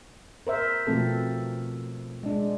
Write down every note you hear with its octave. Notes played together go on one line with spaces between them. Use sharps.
A#4 C5 E5
B2 F3 A3 C4 A4
G#3 D4